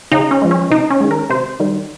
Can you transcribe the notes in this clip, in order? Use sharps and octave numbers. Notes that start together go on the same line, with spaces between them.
C#3 D#4
C#4
F3 G#3
C#4
C3 D#4
C#4
D#3 G#3
A#4
C3 C5
D#3 G3